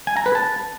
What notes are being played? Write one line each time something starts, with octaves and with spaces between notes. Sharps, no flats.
G#5
A#5
B4
A5